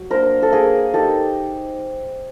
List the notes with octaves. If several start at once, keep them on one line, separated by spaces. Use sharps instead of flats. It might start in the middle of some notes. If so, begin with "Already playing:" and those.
Already playing: F#3
A#3 D4 A#4 C5
A4
A#3 G#4 A#4
D#4 G4 A4